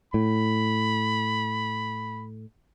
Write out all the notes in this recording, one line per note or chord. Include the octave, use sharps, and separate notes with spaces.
A2 B5